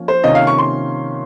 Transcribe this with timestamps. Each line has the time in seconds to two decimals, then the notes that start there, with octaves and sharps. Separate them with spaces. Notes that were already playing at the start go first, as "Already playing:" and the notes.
Already playing: F3 A#3 C#4
0.08 C5
0.23 C3 D#3 A#3 C#4 F4 D#5
0.35 F5
0.47 C#6
0.58 C6